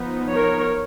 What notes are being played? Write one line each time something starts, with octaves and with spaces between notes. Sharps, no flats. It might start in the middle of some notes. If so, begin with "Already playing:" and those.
Already playing: F3 B3 D#4
A#4 C#5